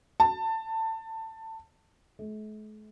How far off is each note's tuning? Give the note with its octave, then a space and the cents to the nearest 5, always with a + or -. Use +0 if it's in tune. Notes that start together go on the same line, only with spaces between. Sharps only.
A5 +20
A3 -45